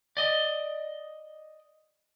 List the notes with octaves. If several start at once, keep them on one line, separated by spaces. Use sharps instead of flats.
D5 D#5